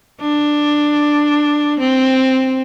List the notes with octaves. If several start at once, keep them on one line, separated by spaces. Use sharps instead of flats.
D4
C4